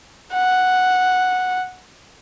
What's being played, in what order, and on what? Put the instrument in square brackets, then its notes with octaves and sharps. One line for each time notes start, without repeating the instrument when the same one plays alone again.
[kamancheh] F#5